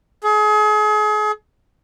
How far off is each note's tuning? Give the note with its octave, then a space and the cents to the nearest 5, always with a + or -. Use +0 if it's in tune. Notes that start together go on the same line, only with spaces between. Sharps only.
G#4 +35